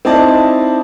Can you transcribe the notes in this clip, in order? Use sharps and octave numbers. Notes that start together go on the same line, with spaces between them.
C4 D#4 E4 D5 D#5 A5